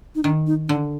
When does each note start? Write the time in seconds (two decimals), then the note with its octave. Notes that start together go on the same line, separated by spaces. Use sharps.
0.15 D#4
0.23 D#3 D4
0.47 D#4
0.68 D3 D4